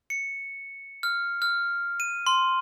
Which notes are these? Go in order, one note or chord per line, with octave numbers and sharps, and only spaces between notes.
C#7
F6
F6
D#7
C6